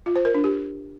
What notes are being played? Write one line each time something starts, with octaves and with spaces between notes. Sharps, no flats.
F4
C5
A#4
D4
G4